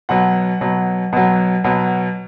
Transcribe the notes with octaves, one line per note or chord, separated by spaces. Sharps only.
B2 F#3 F#5
B2 F#3
B2 F#3
B2 F#3